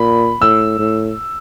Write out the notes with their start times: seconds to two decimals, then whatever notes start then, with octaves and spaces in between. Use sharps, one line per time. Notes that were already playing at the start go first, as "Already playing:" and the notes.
Already playing: A#2 B5
0.41 A2 E6
0.79 A2